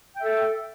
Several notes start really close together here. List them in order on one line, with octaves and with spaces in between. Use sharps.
G5 E5 A4